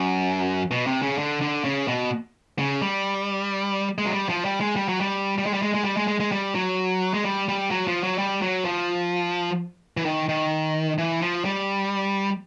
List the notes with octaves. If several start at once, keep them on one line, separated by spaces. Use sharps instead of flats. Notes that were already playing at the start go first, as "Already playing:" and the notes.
Already playing: F#2
B2
C3
C#3
D3
D3
C#3
B2
C#3
G3
G#3
F#3
G3
F3
G3
G#3
G3
F#3
G3
G3
G#3
G3
G#3
G#3
G3
G#3
G#3
G#3
G3
F#3
G#3
G3
G3
F#3
F3
F#3
G3
F#3
F3
E3
D#3
D#3
E3
F3
G3